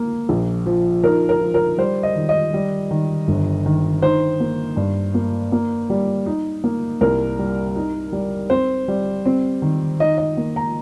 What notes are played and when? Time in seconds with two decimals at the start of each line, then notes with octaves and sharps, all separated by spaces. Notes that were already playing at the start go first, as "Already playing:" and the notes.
Already playing: A#3
0.29 A#1
0.66 F3
1.04 D#4 A#4
1.29 A#4
1.41 F3
1.54 A#4
1.78 G3 C5
2.03 D#5
2.15 D#3
2.29 D#5
2.54 G3
2.91 D#3
3.28 G1
3.66 D#3
4.02 D#4 C5
4.40 A#3
4.77 G2
5.14 A#3
5.52 A#3
5.90 G3
6.26 D#4
6.64 A#3
7.01 C2 A#4
7.39 G3
7.76 D#4
8.12 G3
8.50 C4 C5
8.88 G3
9.26 C4
9.62 D#3
10.00 D#4 D#5
10.18 D#5
10.37 A#3
10.56 A#5